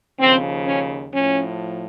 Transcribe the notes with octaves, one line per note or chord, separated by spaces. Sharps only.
D#2 C#3 F3 C4
C#4
A2 F3 C#4